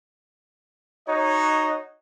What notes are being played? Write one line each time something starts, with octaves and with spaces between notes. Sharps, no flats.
D#4 F#4 C#5 D#5